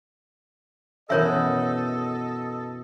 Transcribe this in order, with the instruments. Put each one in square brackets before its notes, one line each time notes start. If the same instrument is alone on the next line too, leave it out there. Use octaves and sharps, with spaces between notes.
[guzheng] F#2 B2 E3 [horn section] A4 D#5 [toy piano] A#4 C#5 E5